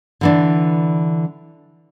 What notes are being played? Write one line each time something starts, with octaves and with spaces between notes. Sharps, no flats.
D3 E3 D4